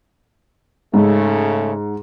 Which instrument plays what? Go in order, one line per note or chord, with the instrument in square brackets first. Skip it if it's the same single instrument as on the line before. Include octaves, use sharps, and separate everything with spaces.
[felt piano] G#2 [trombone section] C#3 A3